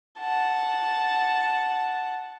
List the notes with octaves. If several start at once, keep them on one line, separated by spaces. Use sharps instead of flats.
F#5 A5